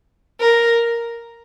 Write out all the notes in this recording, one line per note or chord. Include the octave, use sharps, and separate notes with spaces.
A#4